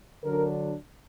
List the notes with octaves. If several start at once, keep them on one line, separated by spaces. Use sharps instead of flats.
D3 F#3 D4 A#4